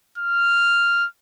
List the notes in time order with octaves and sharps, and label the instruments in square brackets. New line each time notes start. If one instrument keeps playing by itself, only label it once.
[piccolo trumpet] F6